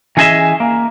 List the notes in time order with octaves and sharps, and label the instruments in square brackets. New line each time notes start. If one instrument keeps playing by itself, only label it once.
[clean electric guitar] E3 C#4 G#4 D#5 E5
A#3